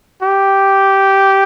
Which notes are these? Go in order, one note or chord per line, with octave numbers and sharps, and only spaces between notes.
G4